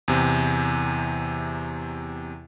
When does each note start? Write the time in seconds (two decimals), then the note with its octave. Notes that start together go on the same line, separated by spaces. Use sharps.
0.08 E2 C3